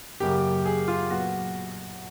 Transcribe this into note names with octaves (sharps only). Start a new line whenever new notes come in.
F#2 C#3 F#3 A#3 G4
G#4
F4
A#2 F#3 B3 F#4